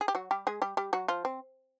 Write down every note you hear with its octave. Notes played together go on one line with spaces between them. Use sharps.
G#4
G4
F#3 F#4
G3 G4
G#3 G#4
G3 G4
G3 G4
F#3 F#4
F3 F4
C4